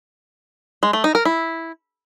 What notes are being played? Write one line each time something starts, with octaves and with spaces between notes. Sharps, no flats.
G#3
A3
D#4
A#4
E4